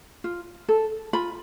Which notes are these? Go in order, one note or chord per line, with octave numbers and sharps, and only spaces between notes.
F4
A4
F4 B5